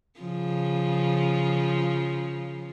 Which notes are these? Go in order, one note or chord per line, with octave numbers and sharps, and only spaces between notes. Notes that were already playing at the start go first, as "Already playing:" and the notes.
C#3 F3